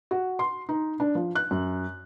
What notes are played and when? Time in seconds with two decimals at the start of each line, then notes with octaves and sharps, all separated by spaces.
0.11 F#4
0.39 C6
0.69 D#4
1.00 D4
1.15 F3
1.35 F#6
1.51 F#2